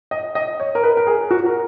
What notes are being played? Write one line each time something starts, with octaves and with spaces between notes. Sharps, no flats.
D#5
D#5
C#5
A#4
B4
A#4
G#4
F#4
A#4